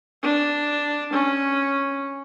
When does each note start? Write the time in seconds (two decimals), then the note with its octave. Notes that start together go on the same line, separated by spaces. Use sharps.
0.23 D4
1.13 C#4